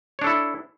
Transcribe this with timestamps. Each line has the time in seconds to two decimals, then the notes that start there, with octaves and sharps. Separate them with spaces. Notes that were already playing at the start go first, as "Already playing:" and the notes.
0.19 C#5
0.21 D4
0.24 A4
0.27 E4